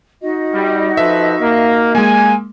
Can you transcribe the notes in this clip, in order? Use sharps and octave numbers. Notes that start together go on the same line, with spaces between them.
D#4 F#4 D#5
G3
F3 A4 B4 E5
A#3
G#3 A#3 G#5